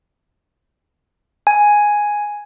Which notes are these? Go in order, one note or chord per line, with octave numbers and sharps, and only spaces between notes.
G#5